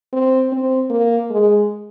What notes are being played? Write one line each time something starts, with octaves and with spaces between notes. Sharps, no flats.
C4
C4
A#3
G#3